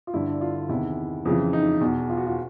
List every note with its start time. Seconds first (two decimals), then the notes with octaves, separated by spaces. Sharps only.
0.07 F4
0.14 G2 D3 E4
0.41 F4
0.69 E2 C3 D#3 E4
1.25 F2 C#3 E3
1.53 D#4
1.81 E2 B2
2.09 F4
2.17 F#4
2.27 F4